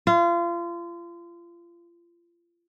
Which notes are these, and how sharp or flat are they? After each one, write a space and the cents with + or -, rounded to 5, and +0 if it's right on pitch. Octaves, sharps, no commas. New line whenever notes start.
F4 -30